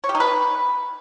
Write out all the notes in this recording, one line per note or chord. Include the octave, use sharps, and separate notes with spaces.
C#5
G4
D#4
B4